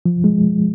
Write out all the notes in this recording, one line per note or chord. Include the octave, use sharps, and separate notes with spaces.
F3
G#3